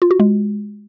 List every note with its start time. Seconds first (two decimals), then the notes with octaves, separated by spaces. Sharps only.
0.02 F4
0.11 F#4
0.20 G#3